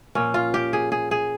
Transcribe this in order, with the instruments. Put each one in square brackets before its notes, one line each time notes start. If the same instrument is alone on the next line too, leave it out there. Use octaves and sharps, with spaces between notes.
[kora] A#2 F3 C#4
F4
G4
G#4
G#4
G#4